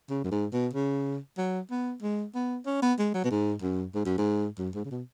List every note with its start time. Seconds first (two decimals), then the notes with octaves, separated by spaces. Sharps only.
0.10 C#3
0.24 F#2
0.31 G#2
0.53 B2
0.74 C#3
1.38 F#3
1.71 B3
2.02 G#3
2.35 B3
2.66 C#4
2.82 B3
2.98 G#3
3.14 F#3
3.24 B2
3.31 G#2
3.62 F#2
3.95 G#2
4.06 F#2
4.18 G#2
4.59 F#2
4.75 G#2
4.85 C#3
4.91 B2